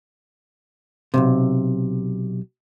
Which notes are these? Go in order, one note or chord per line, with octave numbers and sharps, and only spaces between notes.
B1 F2 C3